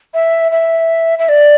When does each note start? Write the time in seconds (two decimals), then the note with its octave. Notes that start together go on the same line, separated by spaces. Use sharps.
0.14 E5
0.52 E5
1.19 E5
1.29 D5